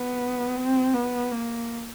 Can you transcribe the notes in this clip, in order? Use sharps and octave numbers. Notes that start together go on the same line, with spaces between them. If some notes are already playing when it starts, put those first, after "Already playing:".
Already playing: B3
C4
B3
A#3